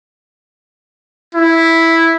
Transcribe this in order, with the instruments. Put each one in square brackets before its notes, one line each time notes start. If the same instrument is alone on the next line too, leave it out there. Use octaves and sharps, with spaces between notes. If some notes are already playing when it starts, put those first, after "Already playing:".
[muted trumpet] E4